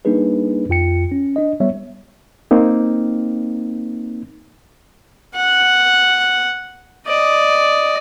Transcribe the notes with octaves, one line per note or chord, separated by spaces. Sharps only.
G3 A#3 D4 D#4 G#4 B4
F2 F4 G5 C#7
C#4
D4 D#5
G3 B3 C#5 E5
A#3 C4 D#4
F#5
D5 D#5